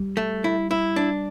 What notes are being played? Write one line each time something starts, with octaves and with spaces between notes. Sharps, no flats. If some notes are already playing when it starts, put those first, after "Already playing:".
Already playing: G3
A3
E4
E4
D4